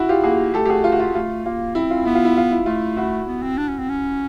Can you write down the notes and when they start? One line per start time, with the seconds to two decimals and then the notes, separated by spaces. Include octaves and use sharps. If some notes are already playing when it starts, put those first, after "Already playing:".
Already playing: E4 F#4
0.09 F4 G4
0.23 A#3 F#4 G#4
0.54 A3 G4 A4
0.65 G4
0.69 F#4 G#4
0.84 F4
0.92 F#4
1.00 F4
1.15 A3 F4
1.45 A#3 F4
1.75 C4 E4
1.91 F4
2.05 B3 E4
2.15 F4
2.25 E4
2.37 F4
2.51 E4
2.66 A3 F4
2.97 E4 F#4
3.27 B3
3.43 C4
3.58 D4
3.69 C#4
3.79 C4
3.89 C#4